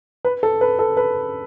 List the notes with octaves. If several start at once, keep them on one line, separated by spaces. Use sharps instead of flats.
B4
A4
B4
A4
B4